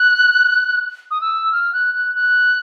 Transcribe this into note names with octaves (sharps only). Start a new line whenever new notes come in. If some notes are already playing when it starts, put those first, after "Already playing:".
Already playing: F#6
D#6
E6
F6
F#6
F#6
F#6